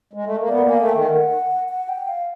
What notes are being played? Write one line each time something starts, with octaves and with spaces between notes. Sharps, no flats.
G#3
A3
A#3
B3 D5
A#3
G#5
A3
D#3 G5
F#5
F#5
G5
F5